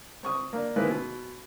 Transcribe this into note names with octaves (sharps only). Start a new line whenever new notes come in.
C4 C#6 D#6
A#3 D4
D#3 G#3 A#3 C4 E4 B4
B2